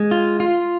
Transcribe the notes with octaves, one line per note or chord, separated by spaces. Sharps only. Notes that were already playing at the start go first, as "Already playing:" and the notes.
Already playing: G#3
F4
F4